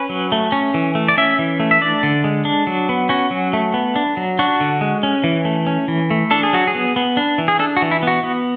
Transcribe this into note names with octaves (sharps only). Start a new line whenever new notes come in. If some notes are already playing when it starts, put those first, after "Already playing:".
Already playing: C#4 B4
F#3
A3
C#4
E3
A3
D5
C#4 E5
E3
A3
E5
D4 D5
D3
G#3
D4
F#3
B3
C#4 F#4
F#3
A3
B3
D4
F#3
D4 F#4
D3
G#3
C#4
E3
A3
C#4
E3
A3
D4 A4
G#4
F#3 F#4
G#4
B3
B3
D4
E3
G#4
D4 A4
F#4
E3
E4
B3 F#4
B3